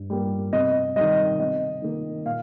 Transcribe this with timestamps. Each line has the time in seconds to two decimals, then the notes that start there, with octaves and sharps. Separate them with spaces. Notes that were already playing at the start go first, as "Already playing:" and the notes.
Already playing: G2
0.10 G3 A#3
0.53 C3 D#5
0.96 G3 D#5
0.99 D#3
1.39 C3 D#5
1.82 D#3 A#3
2.25 A#2 F5